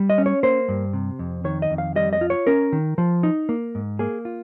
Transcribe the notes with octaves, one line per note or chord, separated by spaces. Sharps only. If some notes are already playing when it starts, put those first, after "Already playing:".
Already playing: G3
D#5
C#4
C#5
A#3 C5
G2
C3
F2
D#3 C#5
D#5
F2
F5
G3 D#5
D#5
F4
C#5
C#4 A#4
D#3
F3
D#4
A#3
G#2
A#3 G#4
F4